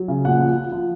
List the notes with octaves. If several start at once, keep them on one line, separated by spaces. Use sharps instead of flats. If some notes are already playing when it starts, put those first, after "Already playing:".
Already playing: F#3
C#3
A#2 F#5
F3
F3
F3